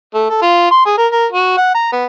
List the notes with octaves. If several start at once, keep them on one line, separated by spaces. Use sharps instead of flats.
A3
A4
F4
C6
G#4
A#4
A#4
F#4
F#5
A#5
B3